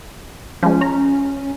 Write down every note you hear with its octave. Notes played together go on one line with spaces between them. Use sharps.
F3 G#3 C#4
C#5 A#5